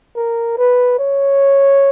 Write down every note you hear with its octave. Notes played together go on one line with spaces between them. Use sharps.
A#4
B4
C#5